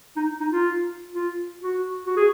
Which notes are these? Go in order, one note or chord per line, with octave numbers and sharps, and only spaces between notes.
D#4
D#4
F4
F4
F#4
F#4
G#4